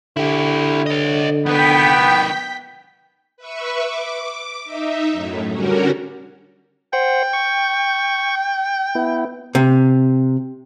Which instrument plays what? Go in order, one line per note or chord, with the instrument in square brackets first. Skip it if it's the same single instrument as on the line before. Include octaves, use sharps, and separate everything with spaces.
[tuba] D3 [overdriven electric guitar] E4 G4
[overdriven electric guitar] C#5 D#5
[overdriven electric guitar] D#3 B4 [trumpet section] B3 [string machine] G5 B6
[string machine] B4 E5 C#6
D6
D#4 E5
F#2 A2
D3 G3 C#4 F#4 A#4
[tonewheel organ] C5 F#5 [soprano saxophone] G5
[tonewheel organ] C#6
B3 E4
[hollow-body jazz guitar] C3